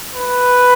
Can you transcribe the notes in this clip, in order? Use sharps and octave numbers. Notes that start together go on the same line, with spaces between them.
B4